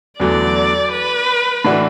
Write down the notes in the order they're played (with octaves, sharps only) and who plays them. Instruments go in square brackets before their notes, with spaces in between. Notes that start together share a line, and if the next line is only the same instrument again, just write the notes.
[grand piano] E2 D3 F#3 A3 [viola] D5
[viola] B4
[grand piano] A2 E3 D4 F#4